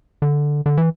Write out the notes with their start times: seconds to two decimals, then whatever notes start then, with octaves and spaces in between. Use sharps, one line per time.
0.22 D3
0.66 D3
0.77 E3